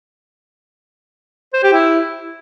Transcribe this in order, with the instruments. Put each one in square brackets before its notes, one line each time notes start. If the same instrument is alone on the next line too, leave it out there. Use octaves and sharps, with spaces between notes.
[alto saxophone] C5
G4
E4